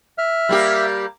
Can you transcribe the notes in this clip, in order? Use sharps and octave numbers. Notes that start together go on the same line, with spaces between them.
E5 F6
G3 A#3 G4